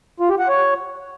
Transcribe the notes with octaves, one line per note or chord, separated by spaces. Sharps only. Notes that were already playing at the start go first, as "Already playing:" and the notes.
F4
G4
F#5
C#5